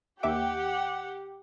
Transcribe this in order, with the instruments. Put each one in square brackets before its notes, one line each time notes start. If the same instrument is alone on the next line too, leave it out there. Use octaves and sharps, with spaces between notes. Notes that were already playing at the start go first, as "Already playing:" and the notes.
[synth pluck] D#2 E5 D6 [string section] G4 [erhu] F#5